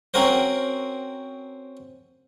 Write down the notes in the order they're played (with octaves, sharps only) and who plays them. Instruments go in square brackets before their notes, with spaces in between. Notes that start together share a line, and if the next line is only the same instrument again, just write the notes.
[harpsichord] C4 C#4 F#4 A#4 C5